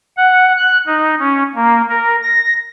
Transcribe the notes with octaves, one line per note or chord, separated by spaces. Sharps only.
F#5
F#6
D#4
C#4
A#3
A#4
A#6